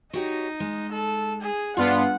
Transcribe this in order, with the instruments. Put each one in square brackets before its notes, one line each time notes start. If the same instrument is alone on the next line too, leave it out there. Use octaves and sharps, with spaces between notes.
[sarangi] D#4 [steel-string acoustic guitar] F#4 G4 C#5
[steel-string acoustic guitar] G#3
[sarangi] A4
G#4
[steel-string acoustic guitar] G2 [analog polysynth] B3 D4 F4 [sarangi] F#5